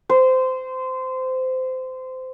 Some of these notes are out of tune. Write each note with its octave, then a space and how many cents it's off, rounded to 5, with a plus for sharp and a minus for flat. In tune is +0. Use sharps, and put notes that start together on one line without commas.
C5 -20